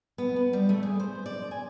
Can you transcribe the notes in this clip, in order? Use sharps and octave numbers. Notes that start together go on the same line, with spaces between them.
B3
B4
G3
A3
G#4
C5
D5
G#5